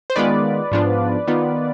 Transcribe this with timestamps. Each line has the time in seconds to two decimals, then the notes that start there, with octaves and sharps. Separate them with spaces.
0.10 C5
0.16 D#3 G#3 B3 F4 B4 D5
0.72 G#2 F3 B3 D4 F4
1.27 D#3 B3 F4